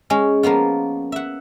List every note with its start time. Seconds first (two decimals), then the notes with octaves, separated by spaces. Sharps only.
0.10 G#3 C#4
0.43 F3 A#3 B3 F4
1.12 E5 F#5